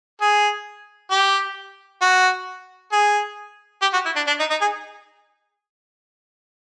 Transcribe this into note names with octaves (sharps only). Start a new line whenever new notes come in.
G#4
G4
F#4
G#4
G4
F#4
E4
D4
D4
D#4
D#4
G#4